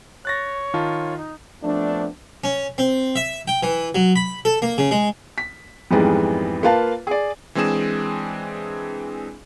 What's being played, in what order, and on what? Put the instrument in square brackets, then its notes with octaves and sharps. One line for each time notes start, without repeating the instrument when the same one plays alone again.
[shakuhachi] C#5 [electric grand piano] F#6 A6 A#6
[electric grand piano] D#3 F4 A5
[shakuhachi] D#4
[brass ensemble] F3 A3 B3 C4 D4
[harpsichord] C#4
C4
E5
G5
E3
F#3
B5
A4
A#3
C#3
G#3
[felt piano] B6
F2 G#2 E3 G3 G#3 B3
A#3 F4 B4 F5 A5
G#4 D5
[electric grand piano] E3 G#3 C4 D4 G#4 E7